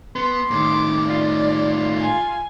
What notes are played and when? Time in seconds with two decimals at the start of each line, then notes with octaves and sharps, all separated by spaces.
0.16 B3 C6
0.51 A2 D#3 D6
1.10 F4 D5
2.01 G#5